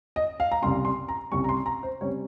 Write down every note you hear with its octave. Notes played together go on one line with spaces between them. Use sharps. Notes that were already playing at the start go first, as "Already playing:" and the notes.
D#5
F5
A#5
C2 C3 G3 C#4 C6
C6
A#5
C2 C3 G3 C#4 C#6
A#5
C6
A#5
C5
C3 G3 C#4 C#5